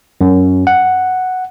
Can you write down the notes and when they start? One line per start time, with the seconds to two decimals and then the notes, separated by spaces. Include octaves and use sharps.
0.21 F#2
0.67 F#5